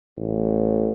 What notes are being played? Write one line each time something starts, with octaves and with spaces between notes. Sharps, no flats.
A1